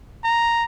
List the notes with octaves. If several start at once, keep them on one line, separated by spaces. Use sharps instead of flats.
A#5